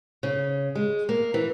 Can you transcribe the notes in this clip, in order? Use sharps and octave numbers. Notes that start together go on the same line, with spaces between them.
C#3
G#3
A#3
E3